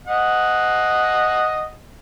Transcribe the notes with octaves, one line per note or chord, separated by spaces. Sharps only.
D#5 F#5